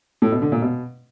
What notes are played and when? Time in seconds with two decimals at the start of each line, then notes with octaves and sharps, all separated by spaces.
0.22 A2
0.32 B2
0.42 D3
0.52 A#2
0.62 B2